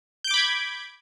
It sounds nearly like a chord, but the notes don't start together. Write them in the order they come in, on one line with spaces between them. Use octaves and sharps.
G6 D7 D6 B5 G#6